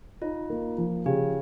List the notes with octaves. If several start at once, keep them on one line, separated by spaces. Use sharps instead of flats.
D#4 F4
A#3
F3
C#3 G4